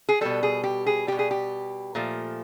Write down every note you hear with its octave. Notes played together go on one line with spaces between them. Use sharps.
G#4
B2 G3 A4
G#4
G4
G#4
B2 G3 G4
G#4
G4
A#2 F3 A3